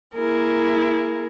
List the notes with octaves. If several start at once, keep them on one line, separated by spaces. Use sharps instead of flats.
A#3 E4 G#4 A#4